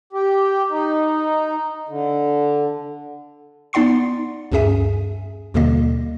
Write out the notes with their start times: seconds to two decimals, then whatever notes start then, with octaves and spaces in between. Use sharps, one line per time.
0.13 G4
0.70 D#4
1.89 D3
3.73 B3 D#4 D5 F#5 C6 C7
4.52 D2 G2 C#4 G#4 E5 G#5
5.54 D#2 B2 D3 G3 A#3 D#5